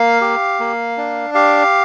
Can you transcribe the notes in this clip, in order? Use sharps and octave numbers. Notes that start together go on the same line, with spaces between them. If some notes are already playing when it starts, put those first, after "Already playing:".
Already playing: A#3 F5
G4
A#3
D4
G4 F5